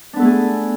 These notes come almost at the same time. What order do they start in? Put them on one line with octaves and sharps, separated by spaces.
D4 B3 A4 A3 G#4